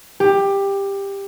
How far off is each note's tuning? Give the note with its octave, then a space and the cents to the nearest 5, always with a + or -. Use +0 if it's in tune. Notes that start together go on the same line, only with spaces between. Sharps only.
G4 +15